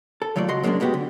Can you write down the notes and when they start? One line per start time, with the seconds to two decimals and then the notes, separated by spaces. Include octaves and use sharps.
0.22 A4
0.36 D#2 F#3 A3 F4 D5
0.48 C#2 F#4 D#5 C6
0.63 F#3 G#3 A#3 C#4 D4
0.80 A2 G#3 B3 F#4 G4
0.94 D3